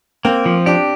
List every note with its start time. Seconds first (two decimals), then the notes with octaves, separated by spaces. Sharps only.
0.24 A#3 C4
0.46 F3
0.66 D4 G4